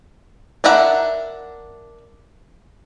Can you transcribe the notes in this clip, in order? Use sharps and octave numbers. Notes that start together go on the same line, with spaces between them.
D4 A#4 E5 F#5